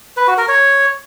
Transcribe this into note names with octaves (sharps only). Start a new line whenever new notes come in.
B4
F#4
A#4
C#5